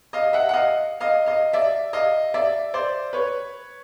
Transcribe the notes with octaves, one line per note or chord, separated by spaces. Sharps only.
D#5 F5
E5 F#5
F#5
D#5 F5
D#5 F5
D#5 F5
D5 E5
D#5 F5
D5 E5
C5 D5
B4 C#5